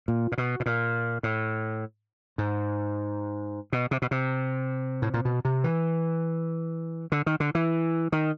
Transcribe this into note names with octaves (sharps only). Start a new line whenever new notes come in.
A#2
A#2
B2
B2
A#2
A2
G#2
B2
C3
B2
C3
A2
A#2
B2
C3
E3
D3
D#3
D3
E3
D#3